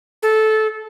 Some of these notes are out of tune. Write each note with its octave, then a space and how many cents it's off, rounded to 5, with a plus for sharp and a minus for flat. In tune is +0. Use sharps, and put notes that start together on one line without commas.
A4 -15